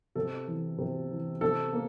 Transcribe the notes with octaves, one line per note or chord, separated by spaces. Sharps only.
C3 A4
E3
C3
E3
C3 A4
A#3